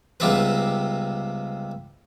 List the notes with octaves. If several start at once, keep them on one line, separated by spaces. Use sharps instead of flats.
C#2 C3 G3 B3 C4 B4